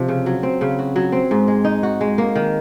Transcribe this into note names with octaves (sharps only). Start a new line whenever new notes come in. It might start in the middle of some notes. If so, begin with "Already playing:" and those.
Already playing: C3 F3 D#4
C#3
F#3
C4
C#3
F#4
F#3
C4
G#2
G#3
D#4
F#4
G#3
A#3
D#3